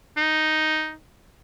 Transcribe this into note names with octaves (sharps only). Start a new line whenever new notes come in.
D#4